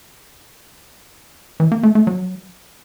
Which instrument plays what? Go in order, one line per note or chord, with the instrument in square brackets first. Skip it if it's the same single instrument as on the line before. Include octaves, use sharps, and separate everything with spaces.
[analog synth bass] E3
A#3
A3
A3
F#3